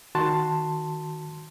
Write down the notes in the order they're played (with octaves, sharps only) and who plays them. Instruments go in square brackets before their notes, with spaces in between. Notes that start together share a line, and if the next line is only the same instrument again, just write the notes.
[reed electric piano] D#3 F#4 A5 C6